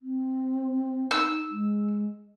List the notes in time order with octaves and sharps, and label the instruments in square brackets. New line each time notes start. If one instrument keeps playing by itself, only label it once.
[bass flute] C4
[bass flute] D#4 [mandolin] E6
[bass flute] G#3